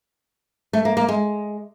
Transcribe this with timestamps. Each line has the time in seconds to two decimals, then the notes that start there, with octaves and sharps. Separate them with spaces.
0.73 A3
0.85 A#3
0.97 A#3
1.08 G#3